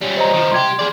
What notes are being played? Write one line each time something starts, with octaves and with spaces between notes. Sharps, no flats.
G3 C#4
C5 D#5 A#5
D#3 F3
C2 G4 C6 G#6
G#4 D5